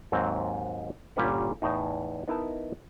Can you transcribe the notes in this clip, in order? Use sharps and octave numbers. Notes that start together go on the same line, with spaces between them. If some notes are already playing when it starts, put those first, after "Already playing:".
D#2 G#2 F#3 C4 D#5
G1 A#2 G3 C#4 B4 F#5
E2 A2 D#4
B3 D#4 E4 A#4 D#5 A5